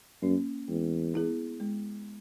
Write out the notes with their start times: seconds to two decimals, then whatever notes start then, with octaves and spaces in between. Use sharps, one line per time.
0.22 F#2 A#3 C#4
0.68 E2 G#3
1.14 B3 E4 G#4
1.60 G#3